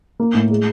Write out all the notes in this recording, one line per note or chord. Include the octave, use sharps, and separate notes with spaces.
A#3
A2
G#3